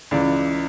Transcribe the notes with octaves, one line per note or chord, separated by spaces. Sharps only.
C#2 C#3 E3 D5